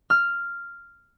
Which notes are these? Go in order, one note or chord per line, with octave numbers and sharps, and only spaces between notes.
F6